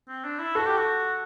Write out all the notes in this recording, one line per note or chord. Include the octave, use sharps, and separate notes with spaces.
C4
D4
E4
F#4 A4
G4
F#4